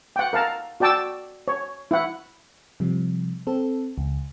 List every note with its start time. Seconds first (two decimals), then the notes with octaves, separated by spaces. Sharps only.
0.16 F#5 G5
0.33 A#4 F5 A5 A#5
0.80 F#4 D5 G5 A5 D6 E6
1.48 C#5
1.91 E4 F#5
2.80 C3 F3 G3
3.47 C4 A4
3.98 C#2